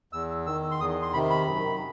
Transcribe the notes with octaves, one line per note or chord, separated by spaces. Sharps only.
E2 E6
D#3 E6
C6
E2 D#6
C6
C3 D#3 B5
B5
F#2